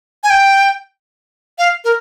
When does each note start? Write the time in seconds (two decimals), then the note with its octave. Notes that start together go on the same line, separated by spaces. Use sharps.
0.24 G#5
0.30 G5
1.59 F5
1.84 A#4